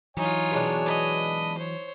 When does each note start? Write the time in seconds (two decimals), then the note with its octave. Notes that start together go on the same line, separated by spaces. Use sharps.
0.17 E3 F#3 D#4 F4 C#5 G#5
0.52 B2 G#3 D4
0.86 D#5 B5
1.58 C5 C#5